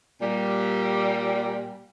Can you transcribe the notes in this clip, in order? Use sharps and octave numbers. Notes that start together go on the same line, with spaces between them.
A#2 G3